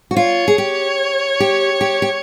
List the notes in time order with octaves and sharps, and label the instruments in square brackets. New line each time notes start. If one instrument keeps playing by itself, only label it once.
[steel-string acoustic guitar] F#4
[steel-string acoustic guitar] F4 [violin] C#5
[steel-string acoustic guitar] G#4
G4
G4
G4
G4